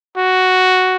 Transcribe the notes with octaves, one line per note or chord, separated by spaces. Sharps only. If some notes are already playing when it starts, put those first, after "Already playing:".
F#4